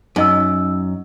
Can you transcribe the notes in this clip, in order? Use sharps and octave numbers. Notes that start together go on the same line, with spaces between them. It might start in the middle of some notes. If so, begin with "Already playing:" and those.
F#2 D#4 D#5 E6